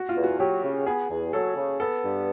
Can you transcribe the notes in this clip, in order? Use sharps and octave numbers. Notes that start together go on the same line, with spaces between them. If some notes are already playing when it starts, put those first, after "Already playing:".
Already playing: F#4
F4
E2
F#4
F#3 G4
C#3
B3 G#4
E2
F#3 A4
C#3
B3 A4
G2